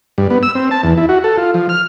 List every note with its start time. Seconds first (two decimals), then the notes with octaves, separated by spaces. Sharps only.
0.18 G2
0.30 B3
0.43 E6
0.55 C4
0.71 A5
0.83 E2
0.97 E4
1.09 F#4
1.24 A4
1.38 F4
1.54 F3
1.69 F6